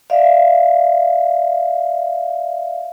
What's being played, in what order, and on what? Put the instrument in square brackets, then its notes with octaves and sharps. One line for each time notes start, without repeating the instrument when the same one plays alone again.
[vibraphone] D5 E5 F5